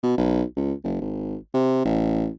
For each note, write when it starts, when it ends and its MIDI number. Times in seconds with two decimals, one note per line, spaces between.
0.03 0.16 47
0.18 0.43 35
0.57 0.73 37
0.84 0.97 30
1.01 1.36 32
1.54 1.82 48
1.85 2.29 33